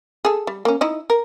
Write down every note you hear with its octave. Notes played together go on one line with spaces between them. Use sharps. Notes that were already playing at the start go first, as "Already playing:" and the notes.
G#4 A4
G3
A#3 C#4
D#4 E4 D#5
A#4